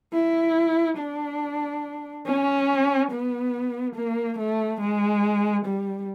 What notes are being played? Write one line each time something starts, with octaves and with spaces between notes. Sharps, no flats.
E4
D4
C#4
B3
A#3
A3
G#3
G3